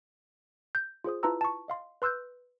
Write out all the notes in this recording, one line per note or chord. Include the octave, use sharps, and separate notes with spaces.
G6
F4 G#4 C5 D#6
E4 F4 B4 A5 A#5 E6
A5 C#6
D#5 F5 C6
B4 C6 E6 F#6 G6